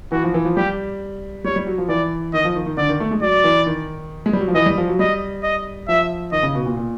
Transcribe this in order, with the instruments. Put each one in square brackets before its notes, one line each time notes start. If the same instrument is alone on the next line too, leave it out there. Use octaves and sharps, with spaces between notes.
[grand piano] E3 [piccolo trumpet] F#4
[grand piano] F3
E3
F3
[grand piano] G3 [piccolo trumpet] G4
[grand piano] G3 [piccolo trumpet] C#5
[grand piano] G3
F#3
F3
[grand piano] E3 [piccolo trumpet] D5
[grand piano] D#3 [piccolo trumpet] D#5
[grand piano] F3
D#3
D#3
[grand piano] D3 [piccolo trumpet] D5
[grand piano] D#3
A3
G#3
[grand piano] F#3 [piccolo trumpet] D5
[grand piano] E3
D#3
G#3
G3
F#3
F3
[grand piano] E3 [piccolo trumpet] D#5
[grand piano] G3
F3
F#3
[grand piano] G3 [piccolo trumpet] D#5
[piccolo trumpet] D#5
[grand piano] F3 [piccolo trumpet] E5
[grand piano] D#3 [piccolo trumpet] D#5
[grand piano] C#3
B2
A#2
A#2